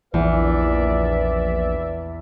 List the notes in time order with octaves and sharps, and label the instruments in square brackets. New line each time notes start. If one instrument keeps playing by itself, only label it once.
[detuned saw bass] A#1 [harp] E2 [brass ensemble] B4 D5 E5